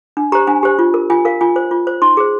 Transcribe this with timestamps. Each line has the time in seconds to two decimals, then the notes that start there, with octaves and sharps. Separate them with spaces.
0.17 D4
0.32 G4 C5 A#5
0.47 D4 G#5
0.63 G4 C5
0.79 F4
0.94 A#4
1.10 F4 G#5
1.25 A#4 F5
1.41 F4 G#5
1.56 C5
1.71 F4
1.87 C5
2.02 D#4 C6
2.17 G#4 C5